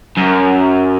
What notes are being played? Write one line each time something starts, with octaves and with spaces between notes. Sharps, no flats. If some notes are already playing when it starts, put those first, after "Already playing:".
F#2